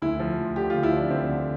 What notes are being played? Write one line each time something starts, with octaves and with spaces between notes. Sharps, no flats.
D2 E4
F3
D2
D3 G4
D2 F4
E4
F3 D4
D2 C4
D3